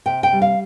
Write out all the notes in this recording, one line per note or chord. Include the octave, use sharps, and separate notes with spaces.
C3 G5
G5
G3
F5